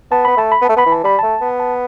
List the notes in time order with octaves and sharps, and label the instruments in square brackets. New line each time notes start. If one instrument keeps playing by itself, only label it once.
[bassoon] B3 [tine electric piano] A5
[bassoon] B3 [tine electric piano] B5
[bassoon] A3 [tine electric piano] A5
[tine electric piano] B5
[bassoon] B3
[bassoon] A3 [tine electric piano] A5
[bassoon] B3 [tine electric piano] B5
[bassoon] E3
[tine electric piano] A5
[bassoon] G3 [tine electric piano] B5
[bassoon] A3 [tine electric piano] A5
[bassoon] B3
[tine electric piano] A5